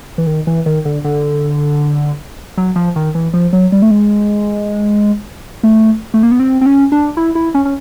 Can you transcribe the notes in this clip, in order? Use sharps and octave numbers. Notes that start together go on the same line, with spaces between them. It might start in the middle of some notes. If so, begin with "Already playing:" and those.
E3
D#3
E3
D#3
D3
D3
F#3
F3
D#3
E3
F3
F#3
G3
A3
G#3
A3
A3
A#3
B3
C4
C4
C#4
D4
E4
E4
C#4
C#4